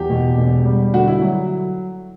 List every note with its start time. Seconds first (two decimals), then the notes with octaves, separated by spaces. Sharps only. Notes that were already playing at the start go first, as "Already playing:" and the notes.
Already playing: E2 G4
0.10 B2
0.38 E1
0.66 G3
0.93 D3 F#4
1.08 E4
1.22 F#3